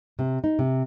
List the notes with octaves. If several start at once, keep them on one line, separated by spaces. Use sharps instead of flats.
C3
D#4
C3